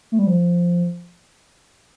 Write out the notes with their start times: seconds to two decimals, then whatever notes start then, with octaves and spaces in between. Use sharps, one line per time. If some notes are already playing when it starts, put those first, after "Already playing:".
0.12 A3
0.19 G3
0.27 F3